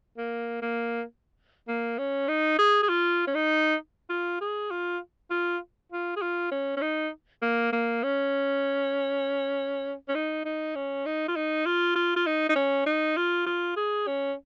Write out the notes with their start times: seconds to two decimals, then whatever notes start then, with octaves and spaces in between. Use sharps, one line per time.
0.17 A#3
0.62 A#3
1.68 A#3
1.98 C#4
2.28 D#4
2.59 G#4
2.83 G#4
2.89 F4
3.27 C#4
3.34 D#4
4.10 F4
4.41 G#4
4.71 F4
5.30 F4
5.92 F4
6.16 G#4
6.22 F4
6.51 C#4
6.77 C#4
6.81 D#4
7.42 A#3
7.73 A#3
8.03 C#4
10.08 C#4
10.15 D#4
10.45 D#4
10.75 C#4
11.06 D#4
11.28 F4
11.36 D#4
11.66 F4
11.95 F4
12.16 F4
12.26 D#4
12.49 D#4
12.56 C#4
12.86 D#4
13.17 F4
13.46 F4
13.76 G#4
14.07 C#4